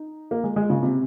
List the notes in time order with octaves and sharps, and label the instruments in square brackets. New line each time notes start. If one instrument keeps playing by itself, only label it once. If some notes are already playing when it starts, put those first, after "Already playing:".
Already playing: [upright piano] D#4
A#3
G#3
G#3
C#3
C3